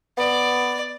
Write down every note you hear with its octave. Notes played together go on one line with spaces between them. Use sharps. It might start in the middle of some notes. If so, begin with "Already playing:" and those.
B3 D5